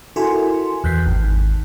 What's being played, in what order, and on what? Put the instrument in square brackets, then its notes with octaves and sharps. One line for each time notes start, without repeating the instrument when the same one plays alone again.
[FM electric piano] E4 F#4 A4 A#4 G#5 C6
E2 F#6 G6 B6 C7
G#1